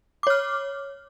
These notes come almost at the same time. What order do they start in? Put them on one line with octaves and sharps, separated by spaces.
D6 C#5 F6